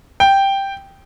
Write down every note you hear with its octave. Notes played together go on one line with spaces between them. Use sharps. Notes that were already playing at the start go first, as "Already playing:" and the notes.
G5